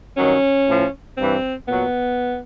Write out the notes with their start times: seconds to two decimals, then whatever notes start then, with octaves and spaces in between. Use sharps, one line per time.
0.17 G2 D#3 F#3 C#4
0.67 A2 F3
1.17 G2 E3 C4
1.68 A#2 F#3 B3